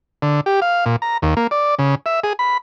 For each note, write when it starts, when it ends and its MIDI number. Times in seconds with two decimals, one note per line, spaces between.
0.22 0.41 50
0.46 0.60 67
0.62 0.85 77
0.86 0.96 46
1.02 1.18 82
1.22 1.34 39
1.37 1.47 58
1.51 1.75 74
1.79 1.95 49
2.06 2.20 76
2.23 2.33 68
2.39 2.57 83